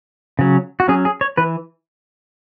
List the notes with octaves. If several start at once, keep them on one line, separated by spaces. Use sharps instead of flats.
C#3 F#3 C#4
F#4
F#3 C#4 G#4
G#4
C#5
E3 B4